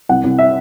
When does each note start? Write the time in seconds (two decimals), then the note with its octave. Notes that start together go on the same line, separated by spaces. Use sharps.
0.09 C2 F#5
0.24 C2
0.39 E5